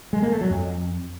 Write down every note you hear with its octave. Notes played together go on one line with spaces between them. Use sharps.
G#3
A#3
A3
F#3
F2